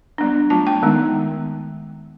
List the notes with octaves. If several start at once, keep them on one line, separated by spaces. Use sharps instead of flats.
G3 B3 D4
F#3 A3 D4 F4 A5
G5
D#3 G#3 B3 D#4